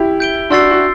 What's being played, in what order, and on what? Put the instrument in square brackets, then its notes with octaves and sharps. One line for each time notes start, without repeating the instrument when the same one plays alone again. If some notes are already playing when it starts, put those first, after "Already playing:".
Already playing: [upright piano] E4 G4
[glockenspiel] G6 D7 G7
[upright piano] D4 F#4 [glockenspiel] C6 E6 A6 C7
[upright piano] F#4